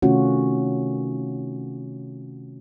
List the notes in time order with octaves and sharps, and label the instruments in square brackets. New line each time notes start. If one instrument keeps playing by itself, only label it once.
[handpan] C3 D#3 A3 C#4 F4 F#4